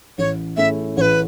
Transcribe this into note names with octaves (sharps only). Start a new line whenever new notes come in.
A1 C#5
A2 A3 C#4 E4 E5
A1 B4 C#5